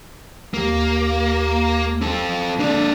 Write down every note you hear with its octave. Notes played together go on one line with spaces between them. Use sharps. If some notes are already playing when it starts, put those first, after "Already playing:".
D#2 A#3
C4 A4
A#3 D4 A4